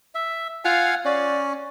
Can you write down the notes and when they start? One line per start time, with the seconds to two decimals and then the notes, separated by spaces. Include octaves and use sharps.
0.15 E5
0.65 F4 F5 F#5 G#5
1.05 C#4 D5